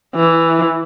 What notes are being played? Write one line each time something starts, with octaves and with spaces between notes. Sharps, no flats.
E3